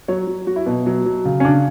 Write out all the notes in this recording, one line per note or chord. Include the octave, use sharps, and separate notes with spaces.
F#3 C#5
F#3
F#3 F#4
E4
B2 F#4
F#3
F#3
C#3
C#4
C#3 D4